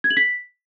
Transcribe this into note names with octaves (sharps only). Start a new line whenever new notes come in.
G#6
F#7
B6